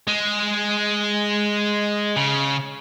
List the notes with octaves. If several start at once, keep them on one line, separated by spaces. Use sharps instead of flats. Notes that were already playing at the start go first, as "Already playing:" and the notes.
G#3
C#3